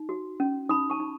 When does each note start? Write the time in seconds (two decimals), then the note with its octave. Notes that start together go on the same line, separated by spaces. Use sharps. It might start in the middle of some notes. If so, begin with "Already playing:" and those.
Already playing: D#4
0.09 F#4
0.40 C#4
0.69 D#4 B5 D#6
0.90 A5 C#6
1.00 D#4